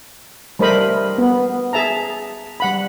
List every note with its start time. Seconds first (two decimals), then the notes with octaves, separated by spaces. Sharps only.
0.59 G3 A3 A#4 C5 D#5 B5
1.18 B3
1.73 G#4 E5 A5 A#5
2.60 G3 F#5 B5